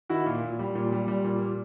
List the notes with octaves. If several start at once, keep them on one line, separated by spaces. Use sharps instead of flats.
D#3 E4 F#4
A#2 F4
A#2
G3
A#2
G3
G3
A#2
A#2